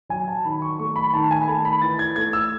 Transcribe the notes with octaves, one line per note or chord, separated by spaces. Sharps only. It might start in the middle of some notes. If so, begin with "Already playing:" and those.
F#3 G#5
A5
D#3 B5
C#6
A3 C#6
B5
D#3 A5
G#5
B5
A3 A5
B5
E3 A6
G#6
A3 G#6
E6